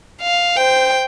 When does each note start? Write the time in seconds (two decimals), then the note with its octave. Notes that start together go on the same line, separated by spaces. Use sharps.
0.21 F5
0.56 C5 G5